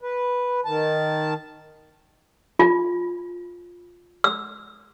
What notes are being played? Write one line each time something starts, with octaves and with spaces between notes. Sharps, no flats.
B4
D#3 A5
F4
E6